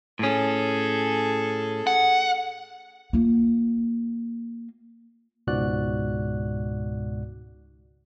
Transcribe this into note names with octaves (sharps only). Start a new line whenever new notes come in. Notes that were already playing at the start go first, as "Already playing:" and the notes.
A2 C#4 G#4 A4
F#5
A#3 F4
C#2 G#2 B2 F#4 D5 F#6